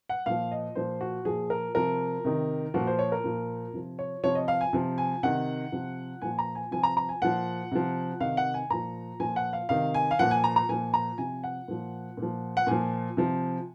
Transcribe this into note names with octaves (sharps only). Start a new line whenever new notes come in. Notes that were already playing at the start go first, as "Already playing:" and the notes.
F#5
A#2 F3 F5
D#5
A#2 F3 C5
F#4
A#2 F3 G#4
A#4
C3 F3 A#4
C3 D#3
A#2 F3 F#4
C5
C#5
A#4
A#2 F3
C3 F3
C#5
C3 F3 C#5
D#5
F5
G#5
C3 F3
G#5
C3 D#3 F#5
C3 F3
A#2 F3 G#5
A#5
G#5
C3 F3 G#5
A#5
A#5
G#5
A#2 F3 F#5
C3 F3
C3 D#3 F5
F#5
G#5
A#2 F3 A#5
A#2 F3 G#5
F#5
F5
C3 D#3 F5
G#5
F5
A#2 F3 F#5
G#5
A#5
A#5
A#2 F3 G#5
A#5
C3 F3 G#5
F#5
A#2 F3
A#2
F3
F#5
A#2 F3 G#5
C3 F3